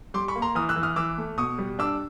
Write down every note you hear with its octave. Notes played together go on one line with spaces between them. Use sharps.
G3 C6 D6
B5 C#6
A#3
A#5 C6
E3 D#6 F6
E6 F#6
E3
D#6 F6
E3 D6 E6
A3
B2 C#6 D#6
G3
D4 D6 E6